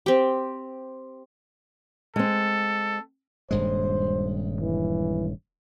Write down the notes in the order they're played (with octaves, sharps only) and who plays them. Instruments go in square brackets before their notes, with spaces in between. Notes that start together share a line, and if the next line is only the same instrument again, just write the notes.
[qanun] C4 G4
[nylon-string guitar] G#3 C4 [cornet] A4
[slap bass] D#1 G2 G#3 [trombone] C5
[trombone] E3